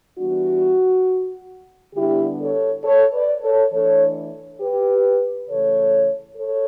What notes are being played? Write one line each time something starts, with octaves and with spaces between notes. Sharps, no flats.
E3 G3 B3 D4 F#4
D3 G3 B3 D4 E4 G4
A4 C#5
A4 C#5
B4 D5
A4 C#5
E3 A3 D4 A4 C#5
G4 B4
C#3 E3 A3 A4 C#5
A4 C#5